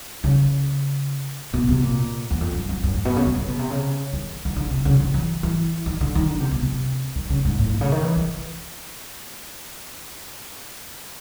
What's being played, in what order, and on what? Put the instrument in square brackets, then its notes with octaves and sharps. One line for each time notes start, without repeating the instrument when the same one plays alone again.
[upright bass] C#3
B2
C3
A#2
E2
F2
F2
F2
F#2
G#2
B2
C#3
D3
D3
B2
C3
C#3
D#3
D#3
D3
C3
C#3
D3
E3
E3
D#3
D3
D#3
D3
C3
B2
C3
D#3
C#3
G#2
A2
A#2
C#3
D#3
E3
D#3